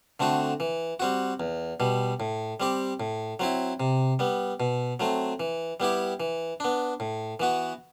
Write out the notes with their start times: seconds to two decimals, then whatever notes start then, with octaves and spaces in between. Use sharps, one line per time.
0.20 D3 A3 C4 F#4
0.60 E3
1.00 G3 C4 F#4
1.40 E2
1.80 B2 G3
2.20 A2
2.60 G3 C4 G4
3.00 A2
3.40 F#3 C4 E4
3.80 C3
4.19 G3 B3
4.60 B2
5.00 F#3 A3 C4
5.40 E3
5.80 G3 B3 E4 G4
6.20 E3
6.60 B3 D4
7.00 A2
7.40 E3 B3 F#4